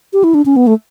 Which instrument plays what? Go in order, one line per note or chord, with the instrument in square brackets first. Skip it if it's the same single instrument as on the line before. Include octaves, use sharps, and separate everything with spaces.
[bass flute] G4
E4
D4
C#4
B3
A3